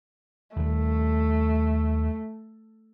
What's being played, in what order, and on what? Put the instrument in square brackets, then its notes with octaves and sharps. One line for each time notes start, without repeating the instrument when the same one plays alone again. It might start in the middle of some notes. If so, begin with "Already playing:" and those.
[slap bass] D#2 G3 [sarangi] A3